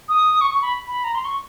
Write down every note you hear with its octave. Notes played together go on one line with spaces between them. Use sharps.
D#6
C#6
C#6
B5
B5
A#5
C6
C#6